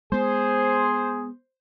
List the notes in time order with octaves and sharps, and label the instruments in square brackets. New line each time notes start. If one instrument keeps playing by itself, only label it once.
[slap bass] G#3 B3 [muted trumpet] G#4 [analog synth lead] C5